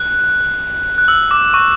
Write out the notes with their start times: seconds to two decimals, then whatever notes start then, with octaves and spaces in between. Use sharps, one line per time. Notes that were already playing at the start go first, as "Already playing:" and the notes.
Already playing: F#6
0.98 F#6
1.08 E6
1.31 D6
1.54 C#6